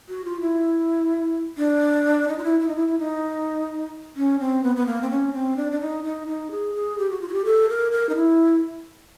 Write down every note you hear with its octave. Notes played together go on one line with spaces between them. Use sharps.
F#4
F4
E4
D4
D#4
F4
E4
E4
D#4
E4
E4
D#4
C#4
C4
B3
B3
A#3
C4
C#4
C4
D4
D4
D#4
D#4
D#4
G#4
G#4
G4
F#4
F4
F#4
G4
A4
A#4
A#4
D#4
E4